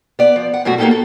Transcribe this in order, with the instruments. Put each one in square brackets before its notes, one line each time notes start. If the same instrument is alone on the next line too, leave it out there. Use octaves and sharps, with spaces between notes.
[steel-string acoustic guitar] B3 D5
F3
F#5
F#2 B2 A3 F#4
A#3 B3 D#4 F4 G4 A4
A4